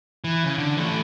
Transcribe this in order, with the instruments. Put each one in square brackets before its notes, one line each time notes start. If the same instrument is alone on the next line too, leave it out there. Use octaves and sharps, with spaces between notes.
[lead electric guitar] E3
C#3
D3
E3 A3